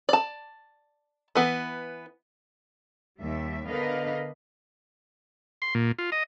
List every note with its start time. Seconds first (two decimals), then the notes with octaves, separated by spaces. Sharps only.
0.09 D5 A5
1.35 E3 B3
3.20 D#2 G3 E5
3.67 D3 B3 A#4 B4 D#5 F5
5.62 C6
5.75 A#2
5.99 F4
6.12 D#5